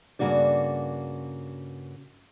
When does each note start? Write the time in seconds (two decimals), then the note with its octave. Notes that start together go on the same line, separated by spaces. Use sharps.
0.19 G2 A#2 C#3 A#3 F#4 D5